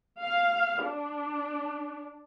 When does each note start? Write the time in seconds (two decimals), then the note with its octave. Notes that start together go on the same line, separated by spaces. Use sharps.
0.21 F5
0.83 D4